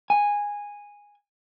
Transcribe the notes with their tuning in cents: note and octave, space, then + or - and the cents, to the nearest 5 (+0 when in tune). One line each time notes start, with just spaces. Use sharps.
G#5 -10